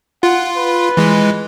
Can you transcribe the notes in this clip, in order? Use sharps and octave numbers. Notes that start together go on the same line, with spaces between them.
F4 F#5
B4
E3 G#3